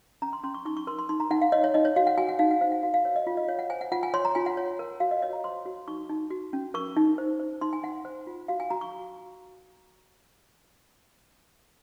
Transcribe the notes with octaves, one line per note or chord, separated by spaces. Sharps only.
C#4 A#5
C6
C#4 C6
C#6
D#4 C#6
C#6
A#4 C6
C6
D#4 C6
A#5
D#4 F#5
F5
C#5 D#5
C#5
D#4 D#5
C#5
F#4 F5
F#5
F#4 G#5
F#5
D#4 F5
F#5
C5 F5
F#5
F#4 F5
F5
A#4 C#5
D#5
F4
D#5
C#5 F5
F#5
C5 G#5
F#5
F4 F#5
G#5
C#5 C6
A#5
F4 G#5
F#5
C#5
A#4
F#4 F5
D#5
C#5 D#5
A#5
C5 C6
F#4
D#4 C#6
D#4
F#4
C#4
A#4 C#6
D#4
C5
C5
D#4 C6
G#5
D#4 F#5
C5
F4
F#4 F5
G#5
F#4 A#5
C#6